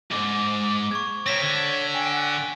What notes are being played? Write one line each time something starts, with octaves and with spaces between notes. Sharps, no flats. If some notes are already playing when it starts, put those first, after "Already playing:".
B1 G#2 D6
C#6 G#6
C4 A#4 C#5 A#6 B6
D3
G5 G#5
F#5